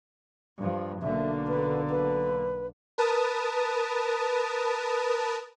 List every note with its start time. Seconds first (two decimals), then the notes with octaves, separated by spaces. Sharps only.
0.59 G2 F3
1.02 B1 D3 A#3 E5
1.48 B4
1.90 B4
2.98 A#4 B4 A5 D#6